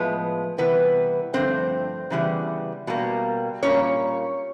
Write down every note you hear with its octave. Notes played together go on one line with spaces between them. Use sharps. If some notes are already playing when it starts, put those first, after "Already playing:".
Already playing: A2 F3 G#3 B3 B4
C3 E3 G3 B3 B4
G2 D3 F3 A3 C4 C5
C#3 E3 G3 B3
B2 G3 A#3
A#2 G3 A#3 C#4 C#5